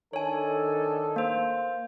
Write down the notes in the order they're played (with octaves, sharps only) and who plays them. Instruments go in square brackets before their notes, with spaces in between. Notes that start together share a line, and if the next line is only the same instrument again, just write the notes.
[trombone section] D#3 D4 A4 [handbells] C#5 G#5
[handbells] A#3 C5